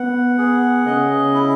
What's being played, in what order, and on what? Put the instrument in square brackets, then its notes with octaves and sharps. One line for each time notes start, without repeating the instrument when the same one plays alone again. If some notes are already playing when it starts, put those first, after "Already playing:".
Already playing: [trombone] B3 [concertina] F#5
[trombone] B3 [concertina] G#4
[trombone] C#3 [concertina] D#5
[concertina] E4